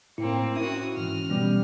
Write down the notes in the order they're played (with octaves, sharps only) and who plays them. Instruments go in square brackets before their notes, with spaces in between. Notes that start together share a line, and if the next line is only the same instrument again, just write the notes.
[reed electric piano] A2 [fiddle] A#3 C4 [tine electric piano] E4
[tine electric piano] C#4 [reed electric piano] E4 [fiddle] F#4 D#6
[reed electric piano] G#2 E3 [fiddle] F6
[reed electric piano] B2 E3 B3 [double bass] G3 [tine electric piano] C#4